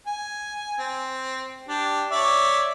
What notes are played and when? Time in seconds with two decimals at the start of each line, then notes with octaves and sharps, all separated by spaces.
0.07 G#5
0.79 C4
1.68 D4 G4
2.11 C#5 D5 E5